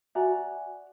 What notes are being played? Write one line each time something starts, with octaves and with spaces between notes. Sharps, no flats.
F#4 D5 E5 G#5 A#5